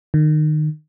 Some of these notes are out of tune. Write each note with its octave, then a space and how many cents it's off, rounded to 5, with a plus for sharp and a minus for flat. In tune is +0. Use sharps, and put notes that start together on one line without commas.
D#3 -25